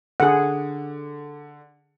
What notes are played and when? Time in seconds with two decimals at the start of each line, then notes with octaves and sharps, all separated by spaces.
0.20 D3 G#4 F#5